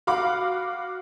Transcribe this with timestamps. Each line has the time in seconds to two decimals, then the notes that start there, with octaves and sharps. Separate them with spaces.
0.07 F#4 F5 B5 D6